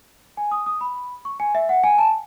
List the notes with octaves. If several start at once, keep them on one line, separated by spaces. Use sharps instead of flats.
G#5
D#6
D#6
B5
C#6
G#5
E5
F#5
G#5
A5